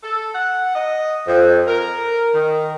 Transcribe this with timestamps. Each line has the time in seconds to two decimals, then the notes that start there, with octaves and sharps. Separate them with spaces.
0.03 A4
0.35 F#5
0.75 D#5
1.27 F2
1.67 A#4
2.34 D#3